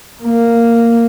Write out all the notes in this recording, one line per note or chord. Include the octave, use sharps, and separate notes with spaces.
A#3